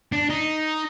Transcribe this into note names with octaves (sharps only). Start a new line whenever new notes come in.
D4
D#4